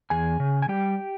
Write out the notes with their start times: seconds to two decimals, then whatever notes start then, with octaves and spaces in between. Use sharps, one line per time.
0.10 E2 G#4 G#5
0.40 C#3
0.62 G#5
0.69 G3 G4 G5